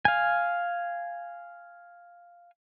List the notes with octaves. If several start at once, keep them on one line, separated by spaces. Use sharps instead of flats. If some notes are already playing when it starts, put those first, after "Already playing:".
F5 G#5